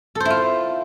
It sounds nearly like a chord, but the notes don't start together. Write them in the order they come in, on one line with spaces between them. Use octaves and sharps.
A4 C5 E4 F4